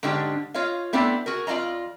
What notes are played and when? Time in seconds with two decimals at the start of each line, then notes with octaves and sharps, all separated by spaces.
0.03 G#2 D3 G#3 C#4 D4 G4
0.54 F4 C#5 D#5 F5
0.93 A3 B3 C4 D4 E4 D5
1.26 F#4 G#4 A#4
1.47 F2 F4 D5 D#5 A#5